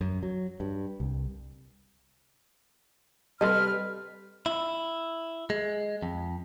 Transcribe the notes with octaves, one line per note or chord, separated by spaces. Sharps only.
F#2
F#3
G2
C2
C3 G3 C4 A4 B4 D#5 B5 F6
E4
G#3
F2